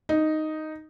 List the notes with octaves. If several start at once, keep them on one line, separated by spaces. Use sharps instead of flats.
D#4